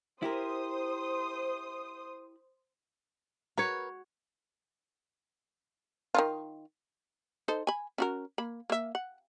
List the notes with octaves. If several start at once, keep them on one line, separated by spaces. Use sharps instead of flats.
E4 G4 A#4 C5 D#6
F#4 A#4 B4 C#5
D#3 D#4 F4
D#4 A4 C5
G#5 B5
C#4 F#4 A#4
A#3 B5
A#3 E5
F#5